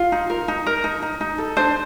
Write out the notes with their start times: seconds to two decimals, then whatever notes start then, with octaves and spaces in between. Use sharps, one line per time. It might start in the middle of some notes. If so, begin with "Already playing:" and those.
Already playing: F4
0.12 D#4
0.30 A#4
0.48 D#4
0.66 A#4
0.84 D#4
1.02 D#4
1.21 D#4
1.38 A4
1.57 D4 C5